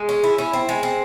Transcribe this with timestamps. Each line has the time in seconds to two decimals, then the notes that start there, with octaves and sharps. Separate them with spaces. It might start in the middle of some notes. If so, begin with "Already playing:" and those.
Already playing: G#3
0.09 C#4
0.24 E4
0.38 C#4
0.53 C4
0.69 G#3
0.83 C4